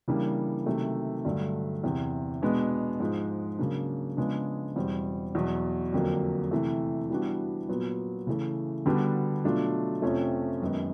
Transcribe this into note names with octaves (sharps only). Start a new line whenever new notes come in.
C#3 E3 G3 A#3 D4
C3 D#3 F#3 A3
G2 D3 F#3 A3
E2 C3 E3
B2 G#3 B3 D4
G#2 F3 G#3
C#3 F#3 A#3 D4
C#3 F3 G#3 B3 D4
E2 B2 G3 C4
E2 B2 F#3
F2 D3 F#3 A#3
C3 E3 A3
E3 G3 B3 D4 F#4
A#2 F#3 B3
C#3 E3 A3
D3 G3 B3 D4 F#4
B2 F#3 A3 D4 F4
F2 C3 F3 A3 C#4
F#2 D#3 G#3 B3 D#4